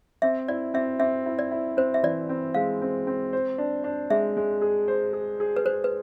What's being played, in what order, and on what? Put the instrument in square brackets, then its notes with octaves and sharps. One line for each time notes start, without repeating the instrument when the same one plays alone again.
[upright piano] C4 [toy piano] E5
[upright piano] E4 [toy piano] D5
[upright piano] C4 [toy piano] E5
[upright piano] C4 [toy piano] E5
[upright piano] E4
[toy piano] D5
[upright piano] E4
[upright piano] C4 [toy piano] C5
[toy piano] E5
[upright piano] E3 [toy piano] D5
[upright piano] C4
[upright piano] G#3 [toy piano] F5
[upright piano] C4
C4
C5
D4
D4
[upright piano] G#3 [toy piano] E5
[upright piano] G#3
G#4
C5
G#4
G#4
[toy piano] B4
[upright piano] G#4 [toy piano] C5
[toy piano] B4